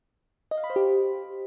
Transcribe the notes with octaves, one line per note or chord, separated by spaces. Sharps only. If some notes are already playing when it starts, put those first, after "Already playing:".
D#5
F5
B5
C5
G4